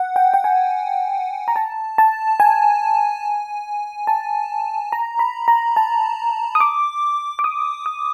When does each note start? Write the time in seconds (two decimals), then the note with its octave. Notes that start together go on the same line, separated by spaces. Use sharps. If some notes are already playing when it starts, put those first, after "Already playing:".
Already playing: F#5
0.16 G5
0.34 G5
0.44 G#5
1.48 A#5
1.56 A5
1.98 A5
2.40 G#5
4.07 A5
4.92 A#5
5.19 B5
5.48 A#5
5.76 A5
6.55 D#6
6.60 D6
7.39 D6
7.44 D#6
7.86 D#6